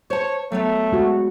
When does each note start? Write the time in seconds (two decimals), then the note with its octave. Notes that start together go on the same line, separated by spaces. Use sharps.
0.10 C5 C#5 A5
0.52 F#3 A3 B3 C#5
0.92 G#3 F#4